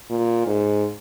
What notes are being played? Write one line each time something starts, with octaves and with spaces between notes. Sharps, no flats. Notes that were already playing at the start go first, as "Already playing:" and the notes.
A#2
G#2